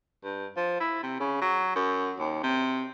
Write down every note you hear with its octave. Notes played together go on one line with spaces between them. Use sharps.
G2
F3
E4
C3
C#3
F#3
F#2
D#2
C3